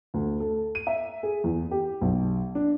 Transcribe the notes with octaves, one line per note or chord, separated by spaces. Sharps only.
D2
A4
D#7
E5
G#4
E2
G4
B1
D4